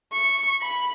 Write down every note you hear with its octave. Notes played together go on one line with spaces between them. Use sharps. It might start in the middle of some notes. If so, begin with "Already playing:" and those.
C#6
B5